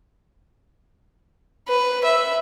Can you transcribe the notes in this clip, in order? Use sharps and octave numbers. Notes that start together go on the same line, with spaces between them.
B4
E5